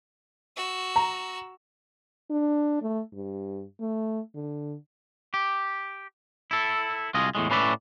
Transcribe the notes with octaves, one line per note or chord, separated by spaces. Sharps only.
F#4 E6
A#5
D4
A3
G2
A3
D3
G4
E4 A4
C2 F4 G#4 D#5
E2 A2 G#3
A2 C#4 B4 D5 E5